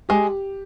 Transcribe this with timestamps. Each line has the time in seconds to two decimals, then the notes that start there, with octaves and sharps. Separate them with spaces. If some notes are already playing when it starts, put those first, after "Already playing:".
0.09 G#3 G4